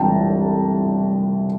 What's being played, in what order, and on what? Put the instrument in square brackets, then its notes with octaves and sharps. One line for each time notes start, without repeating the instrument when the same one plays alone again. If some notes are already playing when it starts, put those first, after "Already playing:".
Already playing: [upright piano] C2 C3 E3 G5 A5 A#5